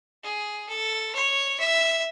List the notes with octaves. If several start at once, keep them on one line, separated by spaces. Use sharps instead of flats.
G#4
A4
C#5
E5